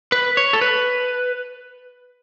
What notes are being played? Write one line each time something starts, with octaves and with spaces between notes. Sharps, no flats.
B4
C#5
A4
B4